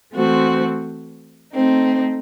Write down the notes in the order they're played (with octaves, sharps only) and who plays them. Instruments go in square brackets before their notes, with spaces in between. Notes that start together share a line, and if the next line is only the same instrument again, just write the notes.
[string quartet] E3 A3 C4 F#4 C5
A3 C4 D#4